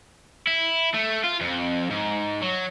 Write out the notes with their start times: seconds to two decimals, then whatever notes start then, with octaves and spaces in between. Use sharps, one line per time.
0.47 E4
0.94 A3
1.24 F4
1.41 F2
1.90 G#2
2.42 F#3